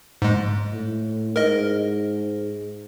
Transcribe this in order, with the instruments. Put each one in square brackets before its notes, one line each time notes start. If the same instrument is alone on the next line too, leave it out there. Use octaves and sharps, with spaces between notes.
[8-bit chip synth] G#2 G#3
[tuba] A2
[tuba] G#2 [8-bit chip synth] A#4 D#5